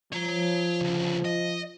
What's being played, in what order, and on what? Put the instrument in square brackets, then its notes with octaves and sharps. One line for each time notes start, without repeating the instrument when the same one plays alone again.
[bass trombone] F3 [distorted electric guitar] C#5 A#5
[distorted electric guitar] D2 C#3
D#5